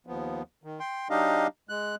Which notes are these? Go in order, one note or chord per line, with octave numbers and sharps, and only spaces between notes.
D#2 F3 B3
D#3
G5 C6
F#3 D4 D#4 G4 D#5 F5
G#3 F#6